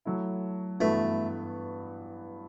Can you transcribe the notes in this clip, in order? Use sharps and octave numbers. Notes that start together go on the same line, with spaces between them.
F#3 A3 E4
G2 E3 A3 B3 F#4 B4